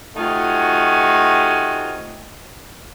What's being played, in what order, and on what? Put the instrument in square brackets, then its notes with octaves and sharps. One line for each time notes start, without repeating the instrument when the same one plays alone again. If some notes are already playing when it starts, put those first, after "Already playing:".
[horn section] C3 A3 D#4 F4 F#4 G#5